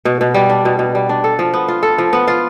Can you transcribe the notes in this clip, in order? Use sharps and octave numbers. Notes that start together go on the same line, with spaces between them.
B2
B2
G3
D4
B2
B2
G3
D4
A4
F3
B3
F4
A4
F3
B3
F4